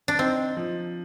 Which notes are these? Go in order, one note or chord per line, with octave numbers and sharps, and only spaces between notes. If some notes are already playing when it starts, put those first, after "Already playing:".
D4
C4 D#4
F3